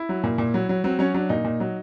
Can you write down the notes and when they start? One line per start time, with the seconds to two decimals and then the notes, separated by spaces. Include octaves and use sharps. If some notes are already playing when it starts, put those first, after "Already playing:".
Already playing: E4
0.09 F#3
0.24 A#2
0.38 A#2
0.54 F#3
0.69 F#3
0.84 F#3 C4
0.99 F#3 C#4
1.14 F#3 D4
1.29 A#2 D#4
1.45 A#2
1.60 F#3